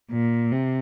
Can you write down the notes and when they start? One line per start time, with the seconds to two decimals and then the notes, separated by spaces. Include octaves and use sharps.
0.10 A#2
0.51 C3